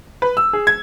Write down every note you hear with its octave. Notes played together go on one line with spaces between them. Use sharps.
B4
E6
G#4
G#6